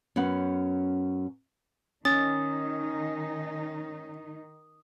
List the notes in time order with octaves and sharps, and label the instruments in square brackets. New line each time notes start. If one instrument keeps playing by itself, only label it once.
[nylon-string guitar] F#2 B3 C#4 F#5
[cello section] D#3 D#4 [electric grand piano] C#4 [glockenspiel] D#6 [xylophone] A6